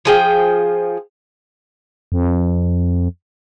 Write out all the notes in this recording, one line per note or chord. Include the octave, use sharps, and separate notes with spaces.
F3 G#4 G5
F2